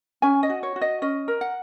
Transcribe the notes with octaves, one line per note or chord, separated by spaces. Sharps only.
C#4 G#5
D#5
F#4
C#5
F#4
D#5
C#4 D#5
A#4
F#5